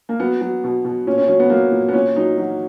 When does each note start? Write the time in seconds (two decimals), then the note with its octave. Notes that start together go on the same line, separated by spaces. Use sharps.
0.09 A#3
0.20 F#3 B3
0.41 F#3
0.64 B2
0.85 B2
1.07 A#2 C#4
1.18 C#4
1.28 F#3 C#4
1.40 B3
1.50 F#3 A#3
1.72 A#2
1.89 B3
1.93 A#2 C#4
2.16 F#3 D#4
2.38 F#3 F#4